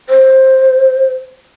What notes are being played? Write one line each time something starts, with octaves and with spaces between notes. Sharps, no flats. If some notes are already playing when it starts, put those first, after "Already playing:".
C5